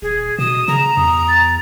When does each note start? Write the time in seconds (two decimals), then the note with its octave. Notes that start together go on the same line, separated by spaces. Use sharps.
0.02 D#1 G#4
0.39 B2 D#6 E7
0.68 C#3 A#5
0.97 E2 D#6
1.28 A6